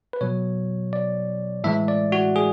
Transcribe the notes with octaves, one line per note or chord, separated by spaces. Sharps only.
B4
B2 F#3 C#5
D5
A2 E3 G#3 E5
D5
F#4
G#4